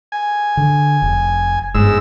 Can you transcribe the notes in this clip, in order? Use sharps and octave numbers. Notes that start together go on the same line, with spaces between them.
G#5
D3
F1
G1 G#2 E6